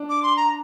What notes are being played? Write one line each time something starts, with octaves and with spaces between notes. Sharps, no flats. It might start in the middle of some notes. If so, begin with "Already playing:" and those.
Already playing: D4
D6
C6
A#5